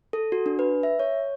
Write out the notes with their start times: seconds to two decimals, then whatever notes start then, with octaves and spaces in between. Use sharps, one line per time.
0.13 A4
0.32 F#4
0.46 D4
0.59 B4
0.83 E5
1.00 C#5